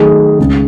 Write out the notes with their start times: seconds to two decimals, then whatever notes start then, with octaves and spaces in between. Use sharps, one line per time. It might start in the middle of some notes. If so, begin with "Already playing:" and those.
Already playing: D#3 F#3 A3 D#4 G#4 A4
0.39 C#2 C#3 G#3